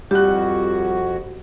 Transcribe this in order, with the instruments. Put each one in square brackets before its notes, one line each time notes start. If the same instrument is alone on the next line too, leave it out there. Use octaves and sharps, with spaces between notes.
[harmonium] F2 F#4 [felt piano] G3 F#6 [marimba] G4